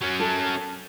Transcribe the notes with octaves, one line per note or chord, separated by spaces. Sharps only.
F#3 C#4
A4